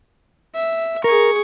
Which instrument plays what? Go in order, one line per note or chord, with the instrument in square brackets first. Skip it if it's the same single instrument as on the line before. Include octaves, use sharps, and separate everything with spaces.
[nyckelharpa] E5
[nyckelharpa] G#4 C#6 [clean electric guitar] A#4